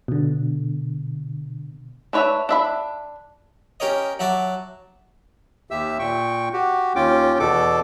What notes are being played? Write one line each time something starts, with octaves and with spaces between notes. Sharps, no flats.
B2 D3
D4 B4 C#5 D5 E5
D4 E5 B5
C#4 G4 A#4 C#5 D#5
F#3 F#4 E5 A5 D6
D#2 G4 E5 E6
A#2 G5 C#6
F#4 G4
D#2 C#4 F4 G5 D6
E2 B2 A4 D6